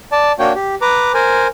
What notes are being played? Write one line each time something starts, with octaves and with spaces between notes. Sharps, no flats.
D5 A5
A#3 D4 F#4 C#5 G5
G4
B4 A#5 D6
A#4 C5 G#5